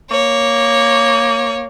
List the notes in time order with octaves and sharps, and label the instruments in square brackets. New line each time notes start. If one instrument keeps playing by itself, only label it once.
[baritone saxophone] A#3 [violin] C#5